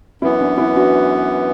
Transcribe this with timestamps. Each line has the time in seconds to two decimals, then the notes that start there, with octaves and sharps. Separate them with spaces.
0.22 F#2 E3 B3 E4
0.40 D4
0.58 E4
0.76 D4 F#4